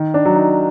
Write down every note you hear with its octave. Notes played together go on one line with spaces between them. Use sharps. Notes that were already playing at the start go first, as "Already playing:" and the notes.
Already playing: D#3
D4
F#3
D#4